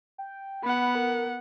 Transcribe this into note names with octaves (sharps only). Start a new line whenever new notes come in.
G5
B3 F#5 B5
A#4